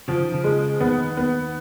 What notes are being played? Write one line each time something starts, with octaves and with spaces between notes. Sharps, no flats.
C#3 F3
D#3
C#3
G#3
D#2 D#3 B3
B3